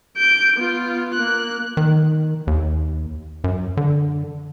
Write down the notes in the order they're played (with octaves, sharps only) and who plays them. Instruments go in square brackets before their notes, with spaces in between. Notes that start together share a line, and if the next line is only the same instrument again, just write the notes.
[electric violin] G6 D7
B3 F4
A#3 F#6
[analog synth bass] D#3
D#2
F#2
D3